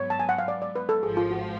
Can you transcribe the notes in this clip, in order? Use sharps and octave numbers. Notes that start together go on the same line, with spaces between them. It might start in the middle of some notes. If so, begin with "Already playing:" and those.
Already playing: G#2 F#3 B3 C#5
A5
G#5
F#5
F5
D5
D5
B4
A4
G#1 G#2 F3 G#4
F4
F#4